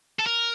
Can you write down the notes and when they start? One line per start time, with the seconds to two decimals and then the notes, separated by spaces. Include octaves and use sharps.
0.20 A4
0.27 A#4